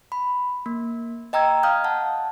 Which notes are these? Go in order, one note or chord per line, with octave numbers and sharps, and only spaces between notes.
B5
A#3
D#5 G5 A#5 E6 G#6
F5 D#6 F6 G6
F#5 A5